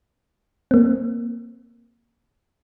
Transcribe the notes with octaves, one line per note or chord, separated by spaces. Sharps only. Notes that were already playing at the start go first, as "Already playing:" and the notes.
A#3 C4